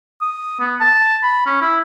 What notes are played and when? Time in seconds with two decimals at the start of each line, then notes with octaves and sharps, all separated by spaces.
0.21 D#6
0.61 B3
0.81 A5
1.23 B5
1.46 C#4
1.62 E4